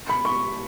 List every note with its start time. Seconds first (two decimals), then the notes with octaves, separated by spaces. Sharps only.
0.09 B5
0.25 C#6